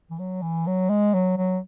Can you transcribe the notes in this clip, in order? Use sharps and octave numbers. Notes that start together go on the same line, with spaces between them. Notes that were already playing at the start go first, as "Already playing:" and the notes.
E3
F#3
E3
F#3
G#3
F#3
F#3